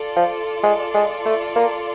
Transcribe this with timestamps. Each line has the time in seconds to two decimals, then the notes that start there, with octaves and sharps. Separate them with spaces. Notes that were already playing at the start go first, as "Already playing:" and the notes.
Already playing: F4 A4 D5
0.17 F3
0.63 G#3
0.94 G#3
1.26 A3
1.56 A#3